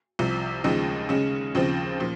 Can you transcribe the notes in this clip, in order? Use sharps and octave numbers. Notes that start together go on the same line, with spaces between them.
C2 C3 F3
D#2 C#3 F3 G#3 D#4
C#3 G#3 C#4
D#2 C#3 F3 C4
A#2 F3